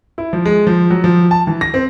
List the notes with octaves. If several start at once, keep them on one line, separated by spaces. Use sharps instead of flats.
E4
F3
G#3
F3
F#3
F3
A5
E3
A#6
C4